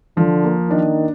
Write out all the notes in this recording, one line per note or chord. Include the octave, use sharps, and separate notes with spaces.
D3 F3
A#3
D#3 D4